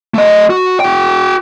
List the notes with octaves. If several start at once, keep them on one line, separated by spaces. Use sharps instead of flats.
A3 D#5
F#4
F#4 G5